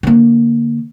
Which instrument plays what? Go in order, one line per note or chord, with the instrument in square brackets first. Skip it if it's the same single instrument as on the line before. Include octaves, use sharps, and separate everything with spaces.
[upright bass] D3 A#3